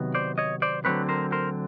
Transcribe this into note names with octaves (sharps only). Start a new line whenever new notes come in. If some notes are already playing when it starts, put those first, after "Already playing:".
Already playing: C3 D#3 F#3 B3
C5 D5
C#5 D#5
C5 D5
D2 D3 F#3 A3 C4 B4 C#5
A#4 C5
A#4 C5